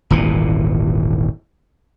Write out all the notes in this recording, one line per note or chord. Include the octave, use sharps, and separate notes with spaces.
D#1 G#1 A#2 E3